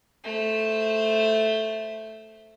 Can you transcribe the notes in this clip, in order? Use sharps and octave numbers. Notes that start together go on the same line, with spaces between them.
A3 C5